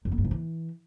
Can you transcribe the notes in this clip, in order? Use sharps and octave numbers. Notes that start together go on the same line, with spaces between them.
F#2
B3
G2
G#2
E3